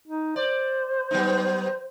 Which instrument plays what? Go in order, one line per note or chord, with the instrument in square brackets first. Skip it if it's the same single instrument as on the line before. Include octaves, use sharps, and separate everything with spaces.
[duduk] D#4
[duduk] C5 [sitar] D5
[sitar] F#3 B3 D#4